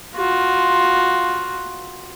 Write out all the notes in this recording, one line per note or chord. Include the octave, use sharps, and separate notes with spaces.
F4 F#4